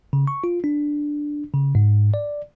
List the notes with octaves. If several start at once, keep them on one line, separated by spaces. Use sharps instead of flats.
C#3
C#6
F4
D4
C#3
G#2
D5